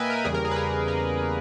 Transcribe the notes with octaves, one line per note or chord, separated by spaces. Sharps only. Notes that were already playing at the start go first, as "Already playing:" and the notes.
Already playing: A#2 A#3 B4 D#5 E5 G5 G#5
A#4
E2 C#3 G3 A#3 G#4
A#4
G#4
B4
A#4
A#4